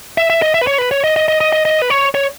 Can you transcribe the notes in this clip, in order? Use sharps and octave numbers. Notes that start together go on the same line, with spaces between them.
E5
E5
D#5
E5
B4
C#5
B4
C#5
D#5
D#5
D#5
D#5
D#5
D#5
B4
C#5
C#5